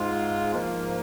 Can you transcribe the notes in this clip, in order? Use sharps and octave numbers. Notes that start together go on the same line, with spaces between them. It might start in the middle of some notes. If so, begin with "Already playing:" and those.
Already playing: G#2 G#3 F4
G#2 F3 A#3